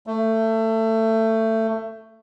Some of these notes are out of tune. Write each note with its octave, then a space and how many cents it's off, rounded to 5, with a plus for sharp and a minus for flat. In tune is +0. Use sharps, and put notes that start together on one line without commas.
A3 +20